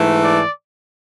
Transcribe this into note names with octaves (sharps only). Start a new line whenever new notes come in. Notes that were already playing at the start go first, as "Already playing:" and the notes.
Already playing: G#2 E3 A3
D5